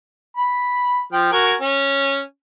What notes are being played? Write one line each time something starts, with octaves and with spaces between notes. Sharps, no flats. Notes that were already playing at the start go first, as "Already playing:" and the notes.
B5
F3 G5
F#4 A#4 G#5
C#4